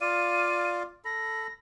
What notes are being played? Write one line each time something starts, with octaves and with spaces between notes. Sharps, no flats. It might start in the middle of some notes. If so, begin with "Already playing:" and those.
F4 D5 F5 D#7
A4 B5 A#6